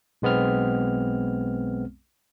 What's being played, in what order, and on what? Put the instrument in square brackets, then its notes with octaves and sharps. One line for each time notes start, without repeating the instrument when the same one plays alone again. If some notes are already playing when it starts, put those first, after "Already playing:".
[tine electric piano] B1 G#3 B3 C4 F6